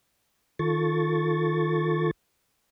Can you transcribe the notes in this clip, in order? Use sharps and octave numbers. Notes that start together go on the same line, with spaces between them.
D#3 F4 A4 C#6 A6